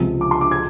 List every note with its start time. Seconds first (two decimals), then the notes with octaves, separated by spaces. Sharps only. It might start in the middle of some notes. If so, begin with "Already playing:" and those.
Already playing: C#2 C3 F3
0.21 D6
0.31 C6
0.41 D6
0.51 G#6